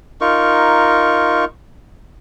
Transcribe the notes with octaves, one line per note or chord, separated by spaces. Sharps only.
D#4 F4 A#4 C#6